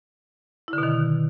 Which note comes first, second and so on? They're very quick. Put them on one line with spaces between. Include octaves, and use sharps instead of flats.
E4 D3 B2 D#3